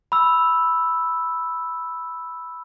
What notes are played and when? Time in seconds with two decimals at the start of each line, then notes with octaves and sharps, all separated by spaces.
0.12 B5 E6